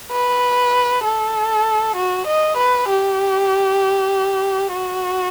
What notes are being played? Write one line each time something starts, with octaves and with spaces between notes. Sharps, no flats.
B4
A4
F#4
D#5
B4
G4
F#4